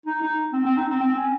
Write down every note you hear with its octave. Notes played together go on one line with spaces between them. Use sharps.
D#4
D#4
C4
C4
D#4
C4
C4
C#4